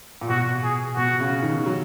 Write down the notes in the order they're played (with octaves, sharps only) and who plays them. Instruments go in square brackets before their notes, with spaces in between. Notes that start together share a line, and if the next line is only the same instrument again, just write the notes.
[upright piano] A#2
[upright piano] B2 [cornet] F#4
[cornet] G#4
[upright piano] B2 [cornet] F#4
[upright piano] C#3
D#3
F#3